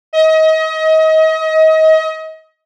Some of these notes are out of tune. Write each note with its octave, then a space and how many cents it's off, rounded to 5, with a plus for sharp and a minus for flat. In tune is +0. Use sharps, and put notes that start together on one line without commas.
D#5 +30